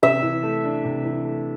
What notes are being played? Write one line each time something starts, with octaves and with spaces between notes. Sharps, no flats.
C3 E5
E3
A3
D4
C3
E3
A3